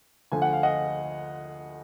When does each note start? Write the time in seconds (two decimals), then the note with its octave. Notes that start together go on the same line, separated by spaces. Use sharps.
0.32 D2 D3 F3 G#5
0.42 F#5
0.53 F5
0.63 D#5 F#5